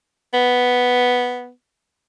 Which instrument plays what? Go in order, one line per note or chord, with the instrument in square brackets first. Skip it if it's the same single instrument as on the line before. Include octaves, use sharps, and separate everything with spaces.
[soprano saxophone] B3